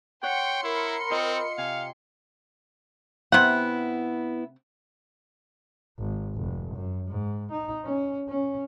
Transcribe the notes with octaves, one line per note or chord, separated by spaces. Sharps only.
C#5 F#5 G5 C6 C#7
E4 A#4 B5
C4 F4 D#5 F5
C3 F5 G#5
C3 B3 E4 F#5
G#1
F1
F#2
G#2
D#4
C#4
C#4